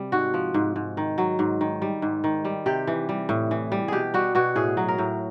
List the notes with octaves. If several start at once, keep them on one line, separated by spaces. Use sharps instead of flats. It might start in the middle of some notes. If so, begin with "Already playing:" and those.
Already playing: C3 G3
G#2 F#4
F3
G#2
G#2
D#3
F#3
G#2
D#3
G3
G#2
D#3
G3
C3 G4
E3
G3
A2
E3
G3
B2 G4 G#4
G3 F#4
B2 F#4
A2 G#4
F#3
A#4
A2